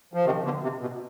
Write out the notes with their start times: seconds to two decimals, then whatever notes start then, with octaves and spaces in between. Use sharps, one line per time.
0.14 F3
0.25 C3 D#3
0.44 B2 D3
0.62 C3
0.81 B2